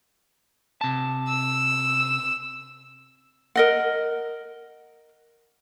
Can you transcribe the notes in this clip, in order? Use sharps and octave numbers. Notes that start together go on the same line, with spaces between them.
C3 A5
E6
A#4 D#5 F#5